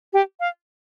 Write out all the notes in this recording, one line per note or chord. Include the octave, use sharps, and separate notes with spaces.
G4
F5